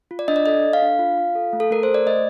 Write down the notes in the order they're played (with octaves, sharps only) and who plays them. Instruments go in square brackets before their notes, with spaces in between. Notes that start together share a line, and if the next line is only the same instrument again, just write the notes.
[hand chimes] F4
D5
D4 D#5
D5
A4 D#5
A4
F5
D4
F4
F4
A4
A3
A4
A3 A#4
C5
A3
D5
A3 D#5